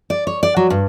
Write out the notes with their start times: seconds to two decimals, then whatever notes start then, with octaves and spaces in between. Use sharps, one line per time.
0.10 D5
0.27 C#5
0.43 D5
0.56 F#3
0.70 G2